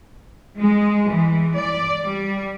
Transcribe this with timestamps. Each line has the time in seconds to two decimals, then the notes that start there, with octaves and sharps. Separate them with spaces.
0.59 G#3
1.09 E3
1.57 D5
2.05 G3